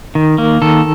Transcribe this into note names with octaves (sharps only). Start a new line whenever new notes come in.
D#3
A#3
D#3 A4